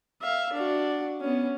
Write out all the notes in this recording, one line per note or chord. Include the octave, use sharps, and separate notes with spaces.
E5 F5
D4 F#4
B3 C#4